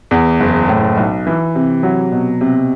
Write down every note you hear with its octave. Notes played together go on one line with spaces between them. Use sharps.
E2
F#1
A2
B1
E3
C3
F#3
B2
C3